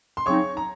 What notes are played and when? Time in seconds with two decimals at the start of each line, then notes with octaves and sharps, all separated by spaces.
0.17 C6
0.26 C#3 F#3 C4 D#4 C#5 C#6
0.57 A#5